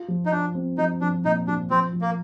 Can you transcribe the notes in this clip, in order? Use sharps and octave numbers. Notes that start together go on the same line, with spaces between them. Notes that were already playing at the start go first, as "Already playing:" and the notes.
Already playing: F4
F3
D#4
D4 F4
C4
F3 D#4
F3 D4
A#2 D#4
F3 D4
F3 C4
F3
A#3